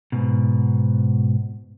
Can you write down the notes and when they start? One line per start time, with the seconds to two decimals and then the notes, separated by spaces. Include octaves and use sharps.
0.12 G#2 B2